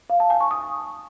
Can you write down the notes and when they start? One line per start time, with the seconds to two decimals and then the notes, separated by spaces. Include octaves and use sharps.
0.10 F5
0.20 A5
0.30 G#5
0.41 C#6
0.51 D#6